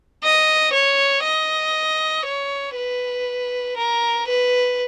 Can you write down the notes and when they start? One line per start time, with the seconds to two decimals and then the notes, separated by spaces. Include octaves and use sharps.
0.24 D#5
0.73 C#5
1.24 D#5
2.26 C#5
2.76 B4
3.77 A#4
4.27 B4